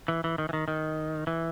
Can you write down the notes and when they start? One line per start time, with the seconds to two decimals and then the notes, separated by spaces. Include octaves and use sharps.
0.08 E3
0.24 E3
0.38 D#3
0.49 E3
0.53 D#3
0.68 D#3
1.27 E3